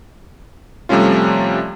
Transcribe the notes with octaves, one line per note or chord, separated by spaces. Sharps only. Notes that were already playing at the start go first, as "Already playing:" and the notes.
C3 F3 G3 A3 C#4 F4